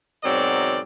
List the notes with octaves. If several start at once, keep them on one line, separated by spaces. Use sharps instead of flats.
G#2 B2 F#3 C4 A#4 D5